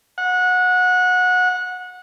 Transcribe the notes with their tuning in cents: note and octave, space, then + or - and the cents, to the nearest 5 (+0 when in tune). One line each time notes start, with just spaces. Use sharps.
F#5 -25